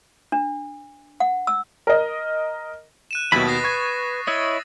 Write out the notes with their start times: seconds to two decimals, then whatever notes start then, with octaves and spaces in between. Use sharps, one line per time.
0.32 D4
1.20 F#5
1.47 E6
1.87 A#4 D#5
3.11 F#6 D#7 E7
3.32 D#2 B2 F#3 E4 B5 A6
3.47 B4 D#6 A#6 C7
3.64 C#6 G#6
4.27 E4 C#5 D#5 E6 A6